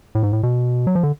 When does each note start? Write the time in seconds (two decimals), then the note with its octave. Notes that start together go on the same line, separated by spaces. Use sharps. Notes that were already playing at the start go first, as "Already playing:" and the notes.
0.15 A2
0.23 G#2
0.33 A2
0.43 B2
0.87 F#3
0.95 F3
1.03 D3